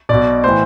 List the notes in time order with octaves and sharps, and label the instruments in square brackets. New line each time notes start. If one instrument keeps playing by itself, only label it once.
[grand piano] B1 B2 D5
A2 E3 C5